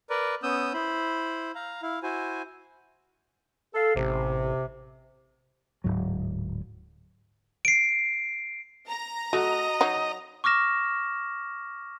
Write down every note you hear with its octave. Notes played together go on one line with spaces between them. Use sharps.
A#4 B4 D5
B3 C#4 D#6 E6 G6
E4 C5 B5
F5 A#5
E4 F5
E4 F#4 C5 G#5
A4 F5
A1 C3
D1 C#2 G#2 F#3
C7 D7
A#5
A3 F#4 D#5
F#3 D#4
C#6 D6 F6 A#6 E7